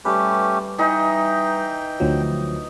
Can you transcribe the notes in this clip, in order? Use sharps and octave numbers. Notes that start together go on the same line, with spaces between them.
G3 A3 C#4 G4 B4
E3 D#4 G5
D2 F3 F#3